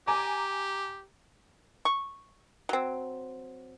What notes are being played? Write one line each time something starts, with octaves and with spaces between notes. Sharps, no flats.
G4 G#5 A#5 D6
C#6
F#3 C4